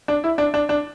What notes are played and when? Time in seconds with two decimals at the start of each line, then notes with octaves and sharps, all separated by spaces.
0.08 D4
0.24 E4
0.38 D4
0.54 D4
0.69 D4